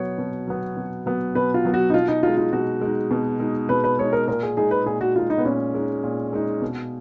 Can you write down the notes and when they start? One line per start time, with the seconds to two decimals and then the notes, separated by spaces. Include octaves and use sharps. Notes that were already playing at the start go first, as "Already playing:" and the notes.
Already playing: B2 F#3 B3 C#5
0.18 B2
0.47 F#3 B3
0.77 B2
1.06 F#3 B3
1.35 B2 B4
1.54 F4
1.65 F#3 B3
1.74 F#4
1.90 D#4
1.94 B2 F4
2.08 D#4
2.23 G#3 D#4 F4
2.38 F4
2.52 B2 F#4
2.81 G#3 D#4
3.11 B2
3.40 G#3 D#4
3.69 B2 B4
3.84 B4
3.99 G#3 D#4 C#5
4.13 A#4
4.28 A#2 A#4
4.43 G#4
4.57 G#3 D#4 G#4
4.71 B4
4.86 A#2 G#4
5.01 F#4
5.15 G#3 D#4 F4
5.30 D#4
5.38 B3
5.45 A#2 C#4
5.74 G#3 D#4
6.03 A#2
6.33 G#3 D#4
6.62 B2